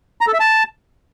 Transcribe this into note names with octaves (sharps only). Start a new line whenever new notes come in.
A#5
A4
E5
A5